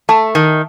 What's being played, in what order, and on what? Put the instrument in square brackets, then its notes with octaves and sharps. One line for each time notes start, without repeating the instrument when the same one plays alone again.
[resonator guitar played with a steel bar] A3 [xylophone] A5
[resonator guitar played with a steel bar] D#3